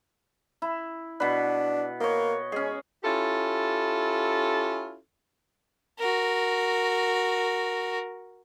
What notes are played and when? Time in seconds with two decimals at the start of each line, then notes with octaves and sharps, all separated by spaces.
0.62 E4
1.20 B2 D4 B4
2.00 A#3 C#5 D#5
2.52 G#3 C#4 G#4
3.03 C#4 E4 F4 G4 A4
5.99 F#4 A#4